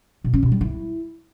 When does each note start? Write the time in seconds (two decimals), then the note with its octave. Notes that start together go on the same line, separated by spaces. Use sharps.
0.24 B2
0.34 C#4
0.43 B2
0.52 G3
0.61 E4